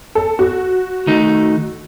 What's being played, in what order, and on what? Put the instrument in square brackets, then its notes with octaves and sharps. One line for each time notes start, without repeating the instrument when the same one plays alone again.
[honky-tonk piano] A4
F#4
[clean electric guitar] D#3 A3 D#4